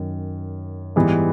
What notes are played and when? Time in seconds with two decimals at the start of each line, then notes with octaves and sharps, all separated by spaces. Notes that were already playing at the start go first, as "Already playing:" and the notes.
Already playing: F#2 D#3
0.96 G#2 E3 G3 B3